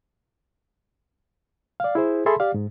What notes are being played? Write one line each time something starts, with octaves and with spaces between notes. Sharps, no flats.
D5 F5
E4 G#4 C5
G#4 A4 E5 A5 B5 C6
G4 D5 F5
G#2